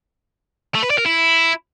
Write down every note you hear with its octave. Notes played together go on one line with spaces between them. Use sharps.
A3
B4
D5
A#4
E4